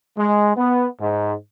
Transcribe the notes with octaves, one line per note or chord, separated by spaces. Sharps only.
G#3
B3
G#2